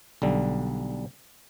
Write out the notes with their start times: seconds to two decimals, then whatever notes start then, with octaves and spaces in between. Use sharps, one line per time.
0.22 B1 D3 G3